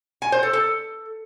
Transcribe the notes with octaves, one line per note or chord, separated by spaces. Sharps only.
G#5
C5
A4
A4